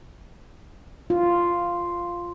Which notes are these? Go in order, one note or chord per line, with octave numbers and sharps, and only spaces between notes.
F4